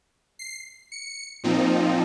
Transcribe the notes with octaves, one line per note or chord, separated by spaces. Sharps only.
C7
C#7
A#2 F3 C4 D#4